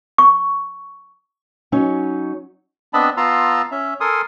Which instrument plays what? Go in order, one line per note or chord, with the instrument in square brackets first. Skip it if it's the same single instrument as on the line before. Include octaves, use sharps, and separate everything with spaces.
[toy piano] C#6
[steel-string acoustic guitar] F#3 C#4 D#4 C#5
[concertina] B3 C4 D4 D#5 A5 B5
B3 F4 A5 A#5 C6 E6
C#4 E5
A4 A#4 G#5 C6 D#6